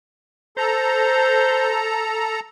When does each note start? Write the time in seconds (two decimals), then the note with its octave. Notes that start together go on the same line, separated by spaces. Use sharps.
0.57 A4 C5 A#5